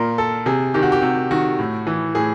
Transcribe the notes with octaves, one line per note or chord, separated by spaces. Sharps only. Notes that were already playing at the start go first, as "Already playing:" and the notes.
Already playing: A#2 A#4
A4
C3 G#4
D#3 G4
F#4
G4
C3 F#4
D#3 F#4
A2
E3
A2 G#4